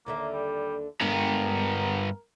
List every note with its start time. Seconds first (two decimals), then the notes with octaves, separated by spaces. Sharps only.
0.06 D#2 D3 A#3 E5
0.33 G3
1.01 G2 G#3 B3 A#4